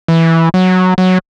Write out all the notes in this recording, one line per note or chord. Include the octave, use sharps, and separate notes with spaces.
E3
F#3
F#3